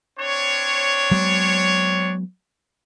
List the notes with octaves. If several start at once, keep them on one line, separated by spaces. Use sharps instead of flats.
C4 D4 C#5
F#3 G#3 B3